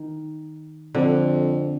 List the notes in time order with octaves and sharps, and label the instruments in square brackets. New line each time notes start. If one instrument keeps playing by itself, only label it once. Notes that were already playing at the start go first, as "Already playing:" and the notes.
Already playing: [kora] D#3
[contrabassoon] F2 [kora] D3